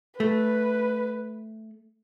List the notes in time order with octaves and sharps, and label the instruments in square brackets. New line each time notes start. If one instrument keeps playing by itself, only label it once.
[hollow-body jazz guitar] A3 [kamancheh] B4